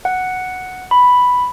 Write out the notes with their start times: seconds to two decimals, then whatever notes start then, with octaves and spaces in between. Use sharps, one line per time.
0.05 F#5
0.91 B5